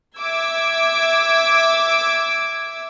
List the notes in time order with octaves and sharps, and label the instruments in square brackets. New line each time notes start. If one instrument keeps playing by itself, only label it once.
[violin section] E5 D6 E6 G#6